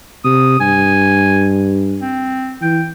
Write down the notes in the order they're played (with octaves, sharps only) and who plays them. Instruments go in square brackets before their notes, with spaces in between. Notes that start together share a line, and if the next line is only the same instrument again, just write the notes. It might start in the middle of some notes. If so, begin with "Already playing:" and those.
[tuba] C3 [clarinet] D#6
[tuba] G2 [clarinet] G#5
[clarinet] C4
[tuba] E3 [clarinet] G5